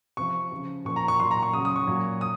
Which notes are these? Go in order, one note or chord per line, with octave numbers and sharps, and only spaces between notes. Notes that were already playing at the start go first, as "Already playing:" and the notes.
C3 F3 C#6
C#3 F3
A#2 F3 C#6
A#5
C#6
A#2 F#3 C6
A#5
C#6
C#3 F#3 D#6
D#6
C#6
A#2 F#3
D#6